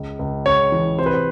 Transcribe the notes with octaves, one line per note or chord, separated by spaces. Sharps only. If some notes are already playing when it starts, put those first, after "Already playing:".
Already playing: C#2
C#2
C#2 C#5
E3
C3 C5
B4
C5